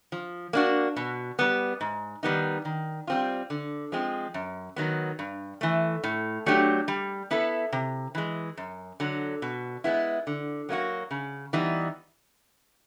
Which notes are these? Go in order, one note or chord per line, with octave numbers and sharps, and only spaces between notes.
F3
A#3 D4 F#4
B2
G3 B3
G#2
D#3 G3 B3 D#4
D#3
G3 C4 F4
D3
F3 G#3 C4
F#2
D#3 F#3 B3
G2
E3 A3
A2
F#3 A3 D4 G4
G3
B3 E4 A4
C3
E3 G#3
F#2
D3 F#3
B2
G#3 B3 E4
D3
F#3 A#3 D#4 F#4
C#3
E3 G3 B3 D#4